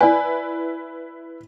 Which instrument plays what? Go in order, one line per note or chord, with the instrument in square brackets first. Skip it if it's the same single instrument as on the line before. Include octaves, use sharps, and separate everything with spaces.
[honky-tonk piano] E4 B4 [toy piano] D5 G#5